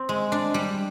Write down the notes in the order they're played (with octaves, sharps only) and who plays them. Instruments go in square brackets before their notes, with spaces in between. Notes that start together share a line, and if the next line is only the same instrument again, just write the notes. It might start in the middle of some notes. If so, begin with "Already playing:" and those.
Already playing: [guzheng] C4
G#3
D4
G3